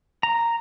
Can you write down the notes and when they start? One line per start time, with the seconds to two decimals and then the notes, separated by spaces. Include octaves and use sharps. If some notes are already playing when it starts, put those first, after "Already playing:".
0.23 A#5